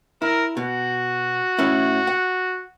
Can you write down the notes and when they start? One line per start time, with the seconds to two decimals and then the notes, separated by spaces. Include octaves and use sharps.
0.22 E4 A#4
0.57 B2 F#4
1.58 A2 C#4 E4
2.07 F#5